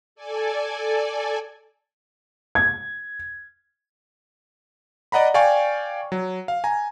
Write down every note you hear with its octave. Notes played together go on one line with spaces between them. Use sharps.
A4 D5 G#5
G#6
D5 D#5 F#5 A#5 B5
D5 F5 G5 G#5 C#6
F#3
F5
G#5 A#5